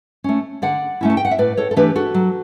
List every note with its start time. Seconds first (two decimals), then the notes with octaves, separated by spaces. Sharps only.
0.24 A3 C#4
0.62 D3 D5 F#5
1.01 A3 C#4 E4
1.10 A5
1.17 G5
1.25 F#5
1.31 E5
1.38 A2 B4 D5
1.57 A4 C#5
1.71 A4
1.76 E3 A3 D4 G4 B4
1.96 F#4 A4
2.15 F#3